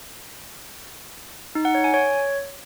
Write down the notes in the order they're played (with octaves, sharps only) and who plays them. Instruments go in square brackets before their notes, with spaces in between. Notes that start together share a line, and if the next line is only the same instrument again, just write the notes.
[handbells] D#4
F#5
C#5
G#5
C#5